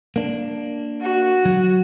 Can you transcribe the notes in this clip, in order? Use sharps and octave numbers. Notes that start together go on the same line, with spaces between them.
A#3 D4
F#4
F#3